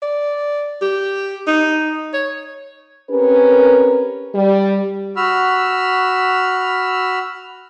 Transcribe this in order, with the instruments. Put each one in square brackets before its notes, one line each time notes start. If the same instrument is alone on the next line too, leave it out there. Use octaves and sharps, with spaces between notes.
[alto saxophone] D5
G4
D#4
C#5
[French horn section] C4 C#4 G4 A#4 B4
G3
[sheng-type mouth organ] F#4 B5 E6 F6